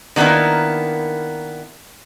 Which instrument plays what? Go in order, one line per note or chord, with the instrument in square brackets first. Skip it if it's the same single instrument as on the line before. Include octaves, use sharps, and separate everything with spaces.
[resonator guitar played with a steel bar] D#3 A#3 B3 D4 E4